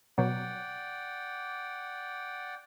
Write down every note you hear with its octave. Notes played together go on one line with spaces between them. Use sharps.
B2 F#3 D5 F#5 G5